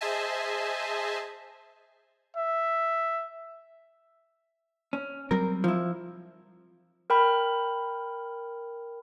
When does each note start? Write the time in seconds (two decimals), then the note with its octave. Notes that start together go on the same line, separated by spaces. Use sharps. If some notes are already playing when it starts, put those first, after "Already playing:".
0.01 G#4 C5 D#5 E5 G#5 A5
2.36 E5
4.93 C#4
5.31 F#3 G3 C4 A#4
5.64 F3 E4
7.10 A#4 G5 B5 F6